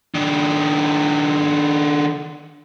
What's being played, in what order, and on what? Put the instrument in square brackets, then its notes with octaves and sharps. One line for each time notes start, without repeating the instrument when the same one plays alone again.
[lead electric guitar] D#3 D4